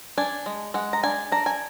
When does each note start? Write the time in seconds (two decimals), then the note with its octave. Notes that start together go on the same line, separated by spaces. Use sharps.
0.18 D4 G#5
0.46 G#3
0.74 G#3 F#5
0.93 A#5
1.03 D4 G#5
1.32 D4 A#5
1.46 G#5